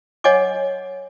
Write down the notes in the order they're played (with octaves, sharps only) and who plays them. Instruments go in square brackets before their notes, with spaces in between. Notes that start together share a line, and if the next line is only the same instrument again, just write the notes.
[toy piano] C#5 D#5 F#5 G#5 D6